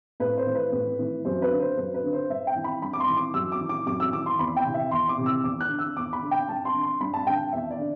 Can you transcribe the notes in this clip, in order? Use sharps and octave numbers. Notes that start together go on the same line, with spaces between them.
A2 B4
C5
E3
B4
A2
E3
F#2 C5
B4
D3
C5
F#2 B4
B4
D3
C5
G2 E5
G5
E3
B5
G2 B5
D6
C6
E3
D6
F#2 E6
D6
E3
D6
F#2 D6
E6
E3 D6
C6
E2 B5
G5
C3 E3
E5
E2 C6
D6
C3 E3
E6
E2 D6
F#6
D3
E6
E2 D6
B5
D3
G5
G2 A5
C6
D3
C6
G2 B5
A5
D3 G5
E2 E5
D5
D3